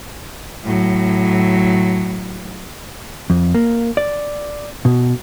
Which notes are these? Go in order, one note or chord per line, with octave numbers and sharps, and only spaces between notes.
A2 F#3
F2
A#3
D5
B2